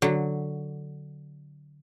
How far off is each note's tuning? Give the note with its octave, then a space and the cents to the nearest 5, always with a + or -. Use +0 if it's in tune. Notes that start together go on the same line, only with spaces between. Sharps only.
D3 +0 F#3 +0